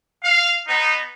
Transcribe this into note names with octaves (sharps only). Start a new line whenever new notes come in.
F5
B3 D#4